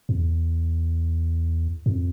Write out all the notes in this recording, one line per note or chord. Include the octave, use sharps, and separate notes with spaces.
E2
F2